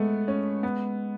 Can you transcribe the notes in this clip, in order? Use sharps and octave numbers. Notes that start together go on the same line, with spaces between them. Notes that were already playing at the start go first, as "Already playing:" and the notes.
Already playing: G#3 A3 B3
C#4
B3